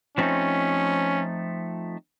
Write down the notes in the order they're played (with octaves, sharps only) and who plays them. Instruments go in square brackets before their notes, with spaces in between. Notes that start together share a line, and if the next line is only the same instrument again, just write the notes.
[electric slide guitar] F3 A3 C4 D#4 [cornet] C#4